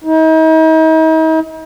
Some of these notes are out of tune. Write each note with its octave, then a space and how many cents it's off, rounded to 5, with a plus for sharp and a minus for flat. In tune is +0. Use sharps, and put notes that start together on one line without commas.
D#4 +40